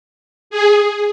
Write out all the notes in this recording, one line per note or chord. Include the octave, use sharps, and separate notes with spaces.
G#4